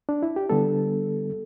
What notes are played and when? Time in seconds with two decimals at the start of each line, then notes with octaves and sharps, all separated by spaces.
0.09 D4
0.23 E4
0.36 G4
0.49 D3 G3 B3 A4